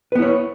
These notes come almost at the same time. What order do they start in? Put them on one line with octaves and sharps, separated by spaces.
B4 B3 E4 C#5